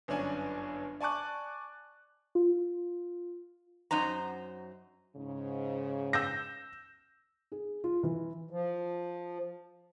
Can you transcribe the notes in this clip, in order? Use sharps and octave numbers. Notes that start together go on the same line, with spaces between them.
G1 F#2 C#4 D4 G#5
D5 G#5 A5 C#6 D6 F#6
F4
F#2 D#4 C5 A#5
G#2 C#3
E6 G6 A#6
G#4
F4
E3
F3